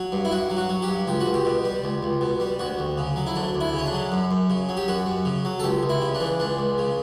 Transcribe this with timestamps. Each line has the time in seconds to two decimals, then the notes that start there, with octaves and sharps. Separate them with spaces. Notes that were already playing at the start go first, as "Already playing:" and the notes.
Already playing: F#3
0.12 G2
0.25 E4
0.31 G2 F#4
0.50 F#3
0.57 F#4
0.69 F#3
0.82 G4
0.88 G2
1.07 C#2 G4
1.20 F#4
1.26 C#2
1.34 G4
1.45 B2
1.64 G3
1.84 C#2
2.03 C#2
2.21 B2
2.40 G3
2.59 D2 F#4
2.79 D2
2.98 C#3
3.16 F#3
3.27 E4
3.36 D2 D4
3.54 D2
3.61 E4
3.73 C#3 C#4
3.86 D4
3.93 F#3
4.12 F#2
4.31 F#2
4.50 C#3
4.69 F#3
4.77 G4
4.88 F#2 F#4
5.06 F#2
5.25 C#3
5.45 F#3
5.60 A4
5.64 C#2 G4
5.83 C#2
5.89 E4
6.02 C#3
6.14 D4
6.20 E3
6.40 C#2 D4
6.58 C#2
6.78 C#3